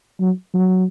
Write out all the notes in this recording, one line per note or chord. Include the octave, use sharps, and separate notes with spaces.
F#3
F#3